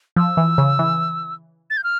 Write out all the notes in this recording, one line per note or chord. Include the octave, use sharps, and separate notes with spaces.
F3 E6
E3
C#3
E3
A6
G6
F6